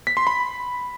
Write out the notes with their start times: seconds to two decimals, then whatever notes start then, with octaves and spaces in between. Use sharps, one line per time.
0.07 B6
0.17 C6
0.27 B5